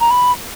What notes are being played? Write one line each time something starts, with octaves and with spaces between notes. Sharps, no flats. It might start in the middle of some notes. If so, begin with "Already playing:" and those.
A#5
B5